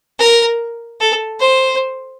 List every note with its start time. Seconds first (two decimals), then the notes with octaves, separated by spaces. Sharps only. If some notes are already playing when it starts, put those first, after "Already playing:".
0.19 A#4
1.00 A4
1.40 C5